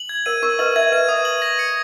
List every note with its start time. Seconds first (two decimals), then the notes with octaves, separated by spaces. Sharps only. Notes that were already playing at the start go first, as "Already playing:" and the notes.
Already playing: F#7
0.09 G#6
0.26 A#4 C#5 D#7
0.42 A#4 C#5 C#6
0.59 B4 D#5 F#7
0.76 C#5 E5 G#6
0.92 B4 D#5 D#7
1.08 C#5 E5 D#6
1.25 F#7
1.42 A#6
1.59 C#7